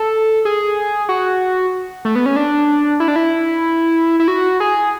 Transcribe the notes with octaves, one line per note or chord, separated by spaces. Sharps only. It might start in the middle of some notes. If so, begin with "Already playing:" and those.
Already playing: A4
G#4
F#4
A3
B3
C#4
D4
E4
D4
E4
E4
F#4
G#4